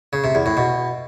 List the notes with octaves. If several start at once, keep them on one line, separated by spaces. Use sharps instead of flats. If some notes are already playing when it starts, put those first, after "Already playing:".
C#3
C3
E2
A2
B2